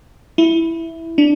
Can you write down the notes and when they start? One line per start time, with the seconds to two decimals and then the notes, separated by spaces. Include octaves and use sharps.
0.38 E4
1.18 D4